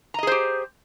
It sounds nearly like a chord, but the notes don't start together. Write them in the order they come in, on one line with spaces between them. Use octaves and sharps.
A#5 D#5 G#4 C5 G4